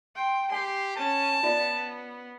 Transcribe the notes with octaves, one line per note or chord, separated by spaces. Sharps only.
G5 C6
G4 G5 G#5 C6
C#4 A5
B3 F4 D5 E5